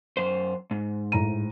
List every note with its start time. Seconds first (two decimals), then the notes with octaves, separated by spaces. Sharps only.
0.17 F#2 C5
0.71 G#2
1.12 A2 A#5 D#7